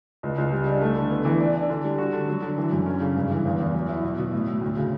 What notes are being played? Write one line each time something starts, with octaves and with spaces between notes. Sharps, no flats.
C#2
C#2
G3
D4
A3
D3
B3
E3
D4
D4
D3
G3
F#4
D3
F#3
D3
E3
F#2
C#4
C#3
G2
E3
E2
E2
F#3
E4
B2
B2
A2
A2
D2
C#3